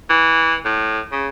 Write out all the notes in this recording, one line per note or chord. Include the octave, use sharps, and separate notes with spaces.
E3
A2
C#3